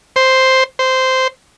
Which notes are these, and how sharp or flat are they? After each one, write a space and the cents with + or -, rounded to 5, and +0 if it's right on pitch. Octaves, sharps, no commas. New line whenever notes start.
C5 +0
C5 -10